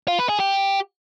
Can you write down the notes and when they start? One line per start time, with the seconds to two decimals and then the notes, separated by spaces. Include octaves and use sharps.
0.08 F4
0.19 B4
0.29 G#4
0.40 G4